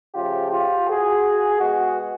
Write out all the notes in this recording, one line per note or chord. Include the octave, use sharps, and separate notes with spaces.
C#3 F3 A3 F4 G4
F4 G4
F#4 G#4
B2 G#3 B3 F#4 G#4